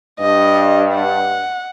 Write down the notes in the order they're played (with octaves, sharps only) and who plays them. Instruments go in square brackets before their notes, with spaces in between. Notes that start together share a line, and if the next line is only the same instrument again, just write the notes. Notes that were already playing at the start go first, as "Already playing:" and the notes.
[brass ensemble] G2 [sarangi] D#5
[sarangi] F#5